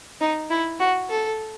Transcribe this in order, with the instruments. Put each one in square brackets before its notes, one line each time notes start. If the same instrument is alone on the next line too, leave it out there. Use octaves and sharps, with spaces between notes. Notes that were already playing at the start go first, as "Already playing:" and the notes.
[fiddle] D#4
E4
F#4
A4